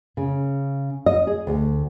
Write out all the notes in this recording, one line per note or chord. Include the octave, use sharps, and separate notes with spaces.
C#3
D#5
G#4
D2